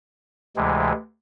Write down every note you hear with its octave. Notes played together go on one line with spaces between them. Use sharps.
D2 C3 E3 G#3